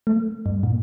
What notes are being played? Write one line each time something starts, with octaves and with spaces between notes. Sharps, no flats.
A3
G2
A#2